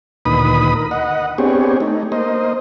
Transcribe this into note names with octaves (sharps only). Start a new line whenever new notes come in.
D2 A#2 D#3 B4 B5 D#6
A#4
D#5 F#5
B3 C4 D4 G4 G#4 C#5
A3 D#4
A#3 C5 D#5